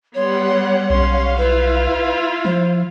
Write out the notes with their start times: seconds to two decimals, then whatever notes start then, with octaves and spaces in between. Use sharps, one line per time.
0.14 G3 B3 C#5 F#5 C6
0.90 B1 C#4 F5 C6
1.38 E4 F4 B4
2.45 F3 C5